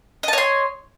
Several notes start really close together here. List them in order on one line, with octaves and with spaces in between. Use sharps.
D#5 A5 C#5 C6